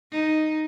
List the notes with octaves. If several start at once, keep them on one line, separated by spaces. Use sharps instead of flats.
D#4